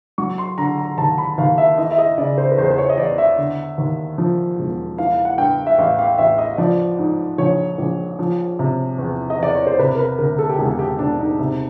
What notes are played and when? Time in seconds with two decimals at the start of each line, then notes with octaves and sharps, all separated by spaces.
0.18 F#3 C#6
0.38 C6
0.58 D3 A#5
0.78 A#5
0.98 D#2 A5
1.18 B5
1.38 D#2 F5
1.58 E5
1.78 E3 D#5
1.91 E5
1.98 D#5
2.18 C#3 D5
2.38 C5
2.52 B4
2.58 E2 C5
2.70 C5
2.78 C#5
2.89 D#5
2.98 E2 D5
3.18 E5
3.38 D3
3.78 D#2
4.18 F3
4.58 E1
4.98 E3 F5
5.12 F5
5.25 F#5
5.38 G2 G5
5.67 E5
5.78 A1 F5
5.99 F5
6.18 A1 E5
6.38 D#5
6.58 F3 D5
6.99 G#2
7.38 A#1 C#5
7.78 A#1
8.19 F3
8.59 C3
8.98 E2
9.30 D#5
9.39 E2 D5
9.55 C#5
9.67 C5
9.79 C3 B4
9.95 A#4
9.99 B4
10.18 D2 A#4
10.39 A4
10.49 G4
10.58 E1 G#4
10.79 G4
10.99 E1 D4
11.19 D#4
11.39 C3